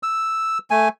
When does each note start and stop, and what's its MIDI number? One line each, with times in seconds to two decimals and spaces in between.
0.03 0.58 88
0.71 0.88 57
0.71 0.88 80